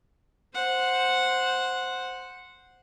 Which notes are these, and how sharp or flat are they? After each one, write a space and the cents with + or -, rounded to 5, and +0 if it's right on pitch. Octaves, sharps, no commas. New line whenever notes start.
C5 +0 F#5 -10